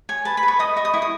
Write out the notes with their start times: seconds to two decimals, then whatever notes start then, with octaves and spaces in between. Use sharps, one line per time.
0.09 C#5 G#5
0.25 B4 A5
0.37 B5
0.43 B4
0.48 C#6
0.59 D#5 D#6
0.77 D#5 C#6
0.85 D#6
0.94 E4 C#6
1.02 D#6